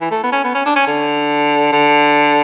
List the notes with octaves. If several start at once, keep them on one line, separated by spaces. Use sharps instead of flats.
E3
A3
B3
C#4
B3
C#4
D4
C#4
D3
D3